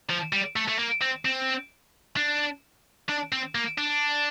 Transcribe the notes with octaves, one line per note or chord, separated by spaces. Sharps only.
F3
G3
A3
A3
A#3
C4
C4
D4
D4
C4
A#3
D4